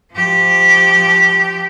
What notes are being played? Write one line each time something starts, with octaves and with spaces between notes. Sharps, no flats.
F3 G4